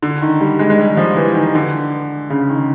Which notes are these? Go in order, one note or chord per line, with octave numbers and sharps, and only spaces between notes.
D3
D#3
G3
G#3
G#3
G3
F3
E3
D#3
D3
C#3
D#3